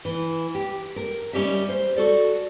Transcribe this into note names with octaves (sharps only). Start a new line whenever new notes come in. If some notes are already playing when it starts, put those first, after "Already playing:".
E3
G4
A#4
G3 C#4 G4 D#5 E5
C5
F#4 A4 D5